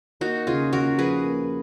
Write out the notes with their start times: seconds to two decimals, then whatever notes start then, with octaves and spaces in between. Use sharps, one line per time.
0.21 A#3 D#4 F#4
0.47 C#3 F4 G#4
0.73 C#3 F#4 A#4
0.98 F3 G#4 B4
1.24 A#3